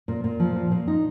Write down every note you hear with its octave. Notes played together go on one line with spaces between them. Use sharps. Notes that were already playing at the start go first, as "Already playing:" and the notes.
A#2
A#2
F3
A#2
A#2
D#4